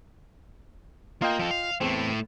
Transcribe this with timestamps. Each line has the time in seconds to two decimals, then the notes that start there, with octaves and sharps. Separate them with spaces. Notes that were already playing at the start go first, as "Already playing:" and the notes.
1.22 A#3 F4 D#5 G5
1.39 F3 A4
1.51 F5
1.81 E2 A2 A3 C4